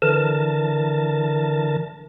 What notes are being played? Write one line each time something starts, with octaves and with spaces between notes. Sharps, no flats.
D3 E3 A#4 A5